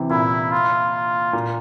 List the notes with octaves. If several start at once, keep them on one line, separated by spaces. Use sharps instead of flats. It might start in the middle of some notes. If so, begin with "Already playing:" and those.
Already playing: C3 E3
A#2 E4
F4
A#2